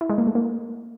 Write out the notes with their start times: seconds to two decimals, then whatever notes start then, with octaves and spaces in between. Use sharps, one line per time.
0.01 E4
0.09 G#3
0.18 A#3
0.27 A3
0.35 A#3